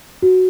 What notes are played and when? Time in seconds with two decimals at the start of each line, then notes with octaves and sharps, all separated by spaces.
0.22 F#4